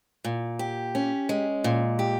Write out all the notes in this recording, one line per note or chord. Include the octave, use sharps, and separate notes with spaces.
A#2
G4
C#4
G#3
A#2
G4